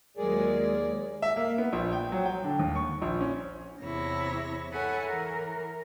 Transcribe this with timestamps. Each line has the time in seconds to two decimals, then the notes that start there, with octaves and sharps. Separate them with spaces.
0.17 D#2 F#3 G#3 G#4 A#4 D5
1.22 E5
1.36 A#3
1.58 B3
1.72 A#1
1.92 G5
2.12 F#3
2.25 G5
2.44 D3
2.59 D#2
2.76 C#6
3.01 A#1
3.21 C#4
3.82 E2 C3 E4 C#5 A#6
4.73 A4 B4 C#5 E5 F#5 G#5
5.07 E3 A#4